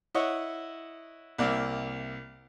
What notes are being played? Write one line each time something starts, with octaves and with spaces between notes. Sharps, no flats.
E4 C#5 D#5 F#5
C2 A#3 D5 E5